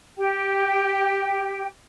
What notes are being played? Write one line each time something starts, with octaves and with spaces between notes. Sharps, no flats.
G4 G5